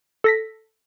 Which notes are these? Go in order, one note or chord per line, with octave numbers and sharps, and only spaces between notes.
A4 A#6 B6